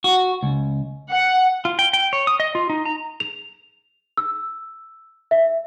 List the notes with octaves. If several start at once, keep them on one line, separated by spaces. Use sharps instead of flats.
F#4
C#2
F#5
F4
G5
G5
C#5
D#6
D#5
F4
D#4
A#5
F7
E6
E5